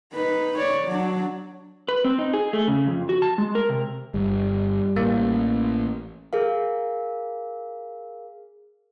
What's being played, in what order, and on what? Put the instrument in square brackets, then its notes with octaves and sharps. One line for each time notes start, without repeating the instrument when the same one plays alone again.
[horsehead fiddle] D#4 B4
C#5 D5
F#3 D4
[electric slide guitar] B4
C4
D#4
G#4
A3
C#3
F2
F#4
A5
G#3
A#4
C3
[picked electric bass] G1 [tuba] G3
[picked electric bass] A1 [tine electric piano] A#3
[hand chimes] G#4 A#4 F5